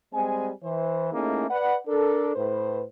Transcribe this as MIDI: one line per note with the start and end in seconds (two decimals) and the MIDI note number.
0.13 0.50 55
0.13 0.50 56
0.13 0.50 60
0.13 0.50 80
0.63 1.11 52
0.63 1.11 72
1.12 1.46 57
1.12 1.46 58
1.12 1.46 61
1.12 1.46 63
1.12 1.46 64
1.12 1.46 68
1.50 1.77 71
1.50 1.77 74
1.50 1.77 78
1.87 2.34 62
1.87 2.34 69
1.87 2.34 70
2.35 2.83 45
2.35 2.83 71
2.35 2.83 72